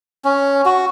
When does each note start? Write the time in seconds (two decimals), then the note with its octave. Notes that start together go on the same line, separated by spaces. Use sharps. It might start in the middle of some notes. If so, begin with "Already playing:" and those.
0.25 C#4
0.65 F#4